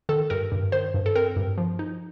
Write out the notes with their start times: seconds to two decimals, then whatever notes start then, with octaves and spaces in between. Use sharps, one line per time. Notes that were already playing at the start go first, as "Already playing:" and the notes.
0.09 D#3 A4
0.30 G2 A#4
0.52 G2
0.72 D#3 C5
0.94 G2
1.06 A4
1.16 C4 A#4
1.36 G2
1.58 F3
1.79 D#4